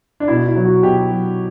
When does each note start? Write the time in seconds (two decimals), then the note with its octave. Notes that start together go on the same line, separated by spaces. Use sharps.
0.20 D4
0.28 B2 E4
0.46 E4
0.55 F#3
0.65 F#4
0.83 B2 G4
1.11 F#3